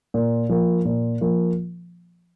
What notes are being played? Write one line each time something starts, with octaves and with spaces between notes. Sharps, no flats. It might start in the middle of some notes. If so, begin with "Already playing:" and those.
A#2
F3 A#3
A#2
F3 A#3